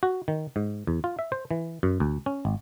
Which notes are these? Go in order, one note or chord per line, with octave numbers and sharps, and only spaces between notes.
F#4
D#3
G#2
E2
F4
E5
C5
E3
F#2
D2
C#4
G#1